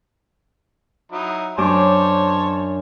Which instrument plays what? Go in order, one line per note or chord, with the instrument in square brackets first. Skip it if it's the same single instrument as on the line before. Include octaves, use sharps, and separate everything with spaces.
[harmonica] F#3 D#4 E4
[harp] F#2 D4 D6 [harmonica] C5 C#5 A5